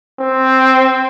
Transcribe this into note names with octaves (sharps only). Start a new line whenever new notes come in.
C4